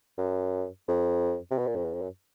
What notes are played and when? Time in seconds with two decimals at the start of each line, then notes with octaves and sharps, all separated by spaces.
0.18 F#2
0.88 F2
1.51 C3
1.58 B2
1.67 A#2
1.75 F2
1.84 E2
1.93 F2
2.02 F#2